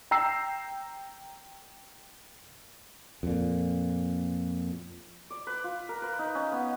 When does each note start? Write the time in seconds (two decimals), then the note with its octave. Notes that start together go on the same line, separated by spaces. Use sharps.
0.11 G5 A#5 E6 C7
3.23 F2 A#2
5.30 D5
5.47 B4
5.64 F4
5.89 A#4
6.02 B4
6.19 D#4
6.35 C#4
6.52 B3